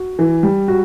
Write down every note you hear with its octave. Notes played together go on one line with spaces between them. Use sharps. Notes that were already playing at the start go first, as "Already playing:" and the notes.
Already playing: F#4
E3
G3
F#4